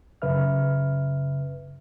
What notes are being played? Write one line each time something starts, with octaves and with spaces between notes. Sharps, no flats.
F#2 C#3 B4 E5 F6